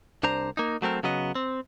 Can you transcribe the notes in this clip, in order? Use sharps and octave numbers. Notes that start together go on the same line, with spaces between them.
C2 D4 C5 A#5
A#3 D#4
F#3 A3 C4 A#4
C#3 F#3 B3 D#5
C4